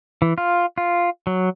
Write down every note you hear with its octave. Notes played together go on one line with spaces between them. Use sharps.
E3
F4
F4
F#3